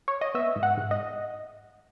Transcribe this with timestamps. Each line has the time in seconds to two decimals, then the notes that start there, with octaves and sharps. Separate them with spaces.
0.08 C#5
0.21 D#5
0.34 B3 E5
0.56 G#2
0.63 F#5
0.77 G#2
0.91 D#5